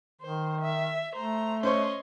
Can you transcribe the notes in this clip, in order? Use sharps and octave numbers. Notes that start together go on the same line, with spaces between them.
D#3 C5
E5
A3 C5 A#5
C#4 C5 C#5 D#5 C6